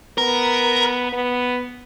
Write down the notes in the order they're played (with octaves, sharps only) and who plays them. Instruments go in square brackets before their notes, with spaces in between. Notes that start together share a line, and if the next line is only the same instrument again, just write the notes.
[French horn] B3 [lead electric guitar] A#4
[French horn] B3